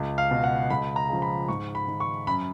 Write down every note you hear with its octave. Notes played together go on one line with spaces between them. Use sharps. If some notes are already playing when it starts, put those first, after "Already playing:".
Already playing: C#2
F5
B2
F#5
C#2 B5
A#5
C#3 F3
B5
G#2 C#6
B5
D#3
C#6
F#2 B5